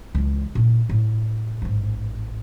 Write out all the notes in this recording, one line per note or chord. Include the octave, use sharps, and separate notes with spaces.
C#2 E3
A#2 D4
A2
A1 G#2